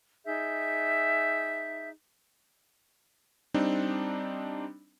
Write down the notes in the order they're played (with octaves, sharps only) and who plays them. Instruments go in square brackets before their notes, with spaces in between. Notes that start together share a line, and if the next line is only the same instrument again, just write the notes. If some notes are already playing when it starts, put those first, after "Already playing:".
[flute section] D#4 G#4 E5 G6
[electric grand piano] G3 C4 D4 D#4